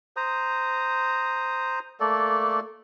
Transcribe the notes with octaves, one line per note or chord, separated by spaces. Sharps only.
C5 A#5 D#6
A3 A#3 A4 D5